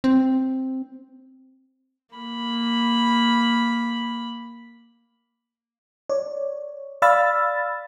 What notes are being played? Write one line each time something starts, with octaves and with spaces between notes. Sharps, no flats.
C4
A#3 B5
C#5 D5
D5 F5 B5 E6 F6 A6